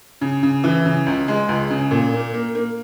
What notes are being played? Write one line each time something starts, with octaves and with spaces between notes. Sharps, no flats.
C#3
C#3
E3
C#3
C#2
G#3
C#2
C#3
A#2
A#3
A#3
A#3